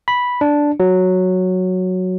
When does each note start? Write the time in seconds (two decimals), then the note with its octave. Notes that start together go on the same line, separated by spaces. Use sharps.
0.08 B5
0.41 D4
0.80 F#3